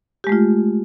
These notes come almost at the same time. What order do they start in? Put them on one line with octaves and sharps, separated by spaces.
G4 G#3 A3 F4